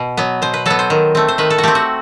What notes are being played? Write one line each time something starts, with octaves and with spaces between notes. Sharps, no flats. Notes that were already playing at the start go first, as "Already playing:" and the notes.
Already playing: B2
F#3 B3
B2 C5
B4
F#3 B3 A4
C5
D#3
A3 C4
C5
D#3 B4
A4
F#4
A3 C4 G4
F#4